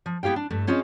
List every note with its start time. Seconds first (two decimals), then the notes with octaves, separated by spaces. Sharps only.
0.06 F3
0.23 B3 E4 G4 F5 G5
0.36 D4
0.50 G2 A3
0.67 C4 C#4 F4 G#4 C5 D#5